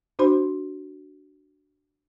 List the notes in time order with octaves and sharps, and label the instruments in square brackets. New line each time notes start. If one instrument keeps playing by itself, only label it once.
[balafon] D4 F#4 C5 B5 C6